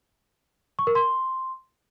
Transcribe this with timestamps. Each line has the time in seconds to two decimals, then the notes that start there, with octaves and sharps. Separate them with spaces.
0.79 C#6
0.87 A#4
0.95 C6